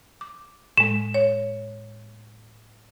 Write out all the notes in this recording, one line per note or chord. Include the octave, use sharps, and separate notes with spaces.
D6
A2 G#3 E7
C#5